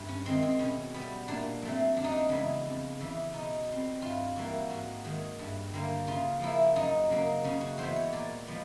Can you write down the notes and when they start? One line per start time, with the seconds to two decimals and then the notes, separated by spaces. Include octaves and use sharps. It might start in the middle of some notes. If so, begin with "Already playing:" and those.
Already playing: G2
0.09 C#4
0.26 D#3 G#3 C4
0.43 C4
0.59 B2 C#4
0.94 G3 B3
1.28 A#2 D4
1.62 F#3 A3 C4
1.97 F#2 D4
2.04 D#4
2.12 D4
2.29 C#3 E3 G#3 B3
2.66 F2
2.99 C#3 E3
3.33 B2 D#4
3.68 G3 C4
4.02 G2 F4
4.36 E3 G3 A#3 F#4
4.70 G#2 F#4
5.04 D#3 G#3
5.39 G2
5.73 D3 G3 A#3
6.07 C#3 F4
6.40 F3 A#3 E4
6.76 F#2 D#4
7.10 C#3 F#3 A#3
7.44 C#3 C#4
7.61 F#4
7.78 E3 G#3 B3 C5
7.96 C#5
8.13 A#2 D5
8.47 F3 G#3 B3